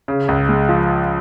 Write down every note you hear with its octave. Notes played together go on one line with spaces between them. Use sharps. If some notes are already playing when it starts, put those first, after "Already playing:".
C#3
C#2
G#3
F3